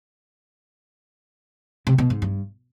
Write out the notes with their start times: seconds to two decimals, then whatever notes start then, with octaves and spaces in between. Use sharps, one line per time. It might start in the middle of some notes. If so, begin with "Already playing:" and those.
1.87 C3
1.98 B2
2.10 G#2
2.22 G2